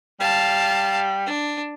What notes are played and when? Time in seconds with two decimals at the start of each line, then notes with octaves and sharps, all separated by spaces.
0.20 G3 F5 A5
1.27 D4